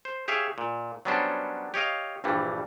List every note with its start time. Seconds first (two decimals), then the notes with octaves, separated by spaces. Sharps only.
0.05 C5
0.28 G4 G#4 C#5 E5 F5
0.58 A#2
1.05 F#3 G3 B3 C#4 D4 C5
1.74 G4 C#5 D#5 F5
2.24 A#1 G2 E3 G3